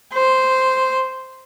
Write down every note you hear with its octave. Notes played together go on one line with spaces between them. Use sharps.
C5